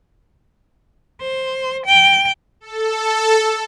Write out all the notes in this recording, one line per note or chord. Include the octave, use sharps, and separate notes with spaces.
C5
G5
A4